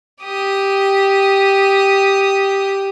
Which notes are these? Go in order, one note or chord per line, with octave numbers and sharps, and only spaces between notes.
G4 D#6